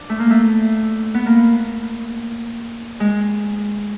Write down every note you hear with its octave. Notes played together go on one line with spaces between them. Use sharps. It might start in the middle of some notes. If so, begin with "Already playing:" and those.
Already playing: D4
A3
A#3
A3
B3
A#3
G#3